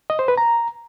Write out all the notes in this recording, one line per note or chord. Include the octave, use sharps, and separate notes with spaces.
D#5
C5
B4
A#5